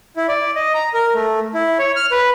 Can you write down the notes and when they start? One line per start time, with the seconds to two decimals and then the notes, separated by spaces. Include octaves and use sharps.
0.17 E4
0.28 D5
0.56 D#5
0.74 A#5
0.94 A#4
1.14 A3
1.54 E4
1.79 C#5
1.96 F6
2.11 B4